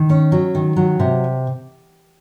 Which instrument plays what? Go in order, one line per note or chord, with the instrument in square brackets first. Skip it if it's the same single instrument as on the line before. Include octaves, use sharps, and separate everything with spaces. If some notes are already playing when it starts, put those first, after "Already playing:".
Already playing: [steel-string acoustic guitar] D#3
C#4
F#3
D#3
F#3
C3